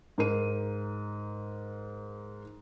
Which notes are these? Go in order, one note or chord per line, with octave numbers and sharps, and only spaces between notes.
G#2 A#4 D#7